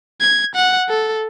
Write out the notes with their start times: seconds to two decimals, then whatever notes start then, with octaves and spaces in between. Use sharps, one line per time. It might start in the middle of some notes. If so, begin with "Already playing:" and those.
0.21 G#6
0.55 F#5
0.89 A4